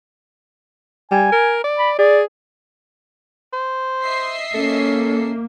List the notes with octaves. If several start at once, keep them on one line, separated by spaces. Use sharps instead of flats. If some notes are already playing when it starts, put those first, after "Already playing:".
G3 G#5
A#4
D5
B5
G#4 D5
C5
D#5 E5 C7
A#3 C#4 A4